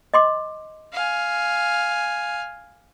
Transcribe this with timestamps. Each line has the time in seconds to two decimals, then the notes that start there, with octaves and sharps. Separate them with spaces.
0.14 D#5 C6 D6
0.93 F5 G#5